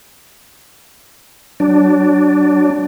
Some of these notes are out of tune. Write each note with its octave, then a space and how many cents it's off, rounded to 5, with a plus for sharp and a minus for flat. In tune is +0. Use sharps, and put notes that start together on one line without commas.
F#3 +25 D4 +0